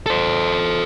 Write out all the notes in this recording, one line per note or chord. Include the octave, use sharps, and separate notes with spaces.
A4 C5